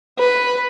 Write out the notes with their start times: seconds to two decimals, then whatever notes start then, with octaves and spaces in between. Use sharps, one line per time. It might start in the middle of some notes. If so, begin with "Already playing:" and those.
0.19 B4